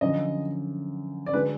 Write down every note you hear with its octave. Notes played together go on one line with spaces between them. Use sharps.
F#2 D3 F3 D#5
D5
D3 G#3 D4 F#4 B4